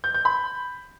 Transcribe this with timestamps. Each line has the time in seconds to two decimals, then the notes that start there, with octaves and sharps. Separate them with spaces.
0.04 G6
0.14 G6
0.25 B5